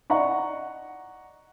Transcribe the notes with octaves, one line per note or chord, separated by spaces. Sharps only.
D5 D#5 F#5 A#5 C#6